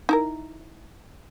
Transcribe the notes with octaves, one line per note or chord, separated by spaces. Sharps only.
D#4 E4 A#4